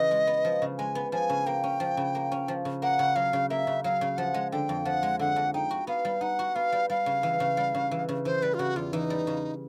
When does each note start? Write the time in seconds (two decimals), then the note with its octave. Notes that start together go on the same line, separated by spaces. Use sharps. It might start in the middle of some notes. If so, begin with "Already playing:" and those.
Already playing: C#3 E3 C#4 D#5
0.11 G#3
0.27 B3
0.45 F3
0.62 C#3
0.78 G#3 G#5
0.95 B3
1.12 F3 G#5
1.29 C#3
1.46 A#3 G5
1.64 C#4
1.80 F3
1.97 C#3
2.15 A#3
2.32 C#4
2.48 F3
2.65 C#3
2.82 A#3 F#5
2.99 C#3
3.16 F#3 F5
3.33 C#3
3.50 A#3 E5
3.67 C#3
3.84 F#3 F5
4.01 C#3
4.17 F3 F#5
4.34 G#3
4.52 D3 G5
4.69 F2
4.85 F3 F#5
5.03 G#3
5.19 D3 F#5
5.36 F2
5.54 D#4 G5
5.71 F#4
5.87 B3 F5
6.05 G3
6.21 D#4 F#5
6.39 F#4
6.55 B3 F5
6.72 G3
6.90 G3 F5
7.06 C#3
7.23 E3
7.40 C#3
7.57 G3
7.75 C#3
7.91 E3
8.09 C#3
8.25 E3 C5
8.42 G3 B4
8.54 F4
8.59 C#3 F#4
8.76 E2 F4
8.93 E3 D#4
9.10 G3
9.27 C#3